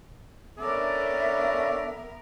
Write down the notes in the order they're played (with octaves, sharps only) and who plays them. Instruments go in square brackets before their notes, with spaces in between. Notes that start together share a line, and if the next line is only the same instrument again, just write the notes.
[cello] B3 A#4 [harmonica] C#4 D4 A4 [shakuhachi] E5 [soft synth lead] D6